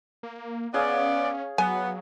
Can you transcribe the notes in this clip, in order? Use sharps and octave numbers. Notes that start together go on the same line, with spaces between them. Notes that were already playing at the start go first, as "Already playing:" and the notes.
A#3
B3 C#4 G#4 C#5 D5 F5
F#3 B3 G#5